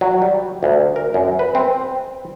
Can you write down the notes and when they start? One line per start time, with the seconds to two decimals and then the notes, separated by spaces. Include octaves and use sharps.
0.01 F#3
0.22 G3
0.63 D2
0.96 A#4
1.14 F#2
1.39 B4
1.55 C4